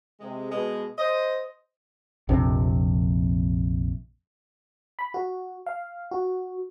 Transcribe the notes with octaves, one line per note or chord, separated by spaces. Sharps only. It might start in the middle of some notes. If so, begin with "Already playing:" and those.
C3 G#3
B2 G#3
C5 D#5
A#1 F2 C3 D4
B5
F#4
F5
F#4